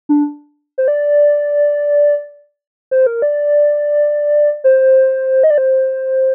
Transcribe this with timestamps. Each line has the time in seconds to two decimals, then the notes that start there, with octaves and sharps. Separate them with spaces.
0.09 D4
0.78 C5
0.88 D5
2.91 C5
3.06 A#4
3.22 D5
4.64 C5
5.44 D#5
5.50 D5
5.58 C5